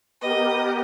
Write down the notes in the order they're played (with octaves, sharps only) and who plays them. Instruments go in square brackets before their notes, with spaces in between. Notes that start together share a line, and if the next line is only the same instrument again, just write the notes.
[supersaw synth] B3 G4 A#4 [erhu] D#5